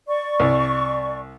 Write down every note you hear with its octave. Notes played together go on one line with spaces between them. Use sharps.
D5 C#6
C2